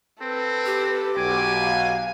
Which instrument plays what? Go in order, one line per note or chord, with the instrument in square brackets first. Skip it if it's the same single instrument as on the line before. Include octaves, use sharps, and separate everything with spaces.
[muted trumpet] C4 [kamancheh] A4 B4
[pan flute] G4
[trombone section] B1 F#4 [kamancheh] G5 D6 [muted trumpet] G#5
[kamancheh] F5